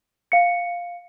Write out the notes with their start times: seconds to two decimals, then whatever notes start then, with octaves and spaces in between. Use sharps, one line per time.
0.32 F5 C#7